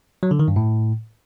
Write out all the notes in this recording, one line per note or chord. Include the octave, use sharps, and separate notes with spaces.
F#3
D3
D#3
G2
A2